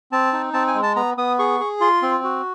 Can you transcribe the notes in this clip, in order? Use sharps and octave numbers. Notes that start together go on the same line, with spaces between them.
C4 A5
D#4
C4 A5
G#5
G#3
A5
B3 A#5
B3 D#6
G#4 C#6
G#4
F4 C6
C4
F#4